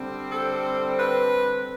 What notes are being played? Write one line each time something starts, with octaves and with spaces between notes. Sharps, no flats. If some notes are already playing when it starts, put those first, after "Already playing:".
Already playing: D3 G3 C4
A4
B4